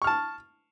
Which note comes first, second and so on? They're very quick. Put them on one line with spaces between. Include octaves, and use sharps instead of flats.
C#6 F6 A5